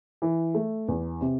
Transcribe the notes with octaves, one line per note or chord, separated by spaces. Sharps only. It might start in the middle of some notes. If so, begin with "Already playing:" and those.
E3
A3
E2
C3